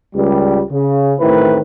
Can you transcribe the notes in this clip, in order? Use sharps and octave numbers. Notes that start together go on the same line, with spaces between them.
C#2 G3
C#3
A1 A2 D#3 C4 E4 B4